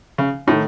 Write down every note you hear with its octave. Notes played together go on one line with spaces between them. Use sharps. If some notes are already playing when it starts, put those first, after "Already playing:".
C#3
A2 D#3 A3 D#4